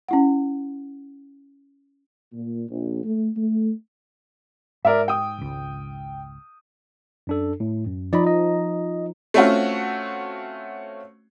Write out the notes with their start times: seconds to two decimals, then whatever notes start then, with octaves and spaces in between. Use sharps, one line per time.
0.09 C#4 E4 F#5
2.32 A#2
2.69 A#1
3.04 A3
3.35 A3
4.85 G#2 A#4 D5 E5
5.08 G5 D#6
5.38 G#1 C#2
7.27 F#2 D4 A4
7.60 A2
7.87 F#2
8.13 F3 D#4 D5 D#5 B5
8.27 D#5
9.34 A3 C4 C#4 F4 F#4